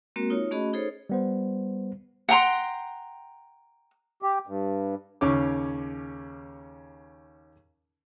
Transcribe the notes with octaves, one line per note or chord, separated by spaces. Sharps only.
G#3 A#3 C4 F#4 A#4
D#4 F4 C#5
A3 C#4 F#4 G#4 D#5 B5
D#4 G#4 A4 C5 C#5
G3 B3 C5
F#5 G5 A#5 C6
G4
G2
D#2 C#3 C#4 C#5 D6